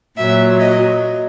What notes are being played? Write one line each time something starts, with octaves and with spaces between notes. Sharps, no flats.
A#2 F#3 E5
D#5